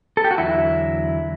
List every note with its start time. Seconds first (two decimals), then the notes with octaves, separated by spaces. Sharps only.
0.17 A4
0.24 G4
0.31 F#4
0.38 E2 D3 F#3 E4